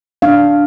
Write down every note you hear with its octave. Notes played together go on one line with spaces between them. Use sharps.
D4 F5